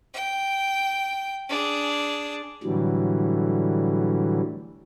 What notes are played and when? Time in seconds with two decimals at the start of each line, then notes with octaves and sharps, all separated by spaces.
0.14 G5
1.49 D4 G#4
2.63 A2 D3 E3 F#3 G3